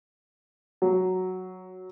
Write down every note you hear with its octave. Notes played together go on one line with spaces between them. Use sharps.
F#3